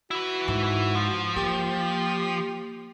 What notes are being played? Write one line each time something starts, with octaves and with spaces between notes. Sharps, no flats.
E4 F#4 B4
G#2
F3
A#3 G4